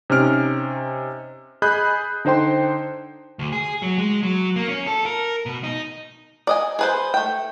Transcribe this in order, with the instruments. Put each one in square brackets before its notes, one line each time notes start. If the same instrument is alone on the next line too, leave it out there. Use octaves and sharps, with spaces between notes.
[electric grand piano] C3 C#4 D#4 F6 D7
G#4 D#5 B5 F#6 G6
D3 D#4 C5 G5 C6
[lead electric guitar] D2
G#4
F#3
G#3
F#3
A#3
C#4
A4
A#4
B2
D#4
[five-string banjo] D5 D#5 G#5
G#4 B4 C5
A3 G5